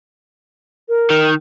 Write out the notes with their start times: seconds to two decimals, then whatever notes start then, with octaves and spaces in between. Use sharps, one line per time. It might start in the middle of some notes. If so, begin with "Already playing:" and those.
0.89 A#4
1.10 D#3